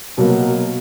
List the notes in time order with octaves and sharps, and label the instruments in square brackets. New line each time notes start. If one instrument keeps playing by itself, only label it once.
[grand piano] B2 F#3 A#3